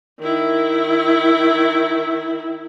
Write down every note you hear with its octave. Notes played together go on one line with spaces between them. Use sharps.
D#3 E4